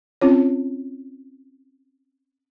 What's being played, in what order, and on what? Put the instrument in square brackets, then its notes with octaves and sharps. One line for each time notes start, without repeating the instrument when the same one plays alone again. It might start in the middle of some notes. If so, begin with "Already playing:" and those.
[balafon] C4 C#4 F4 C#5